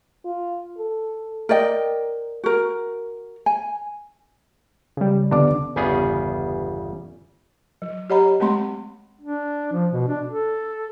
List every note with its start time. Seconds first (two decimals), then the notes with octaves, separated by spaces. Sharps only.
0.25 F4
0.78 A4
1.49 A#4 D5 D#5 G5
2.44 F#4 A#4
3.46 G#5
4.97 C#3 G3
5.31 D3 B3 D4 D6
5.76 G1 E2 C#3 G3 B3 G#4
7.82 F#3
8.10 G4 C#5 D#5 F#5 A#5 B5
8.40 G#3 A3 C4 B5 C6
9.21 D4
9.73 F3
9.92 B2
10.08 D4
10.28 A4